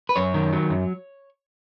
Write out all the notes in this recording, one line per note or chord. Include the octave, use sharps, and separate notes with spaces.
B4
F#2 C#5
D#3
F#3
F#2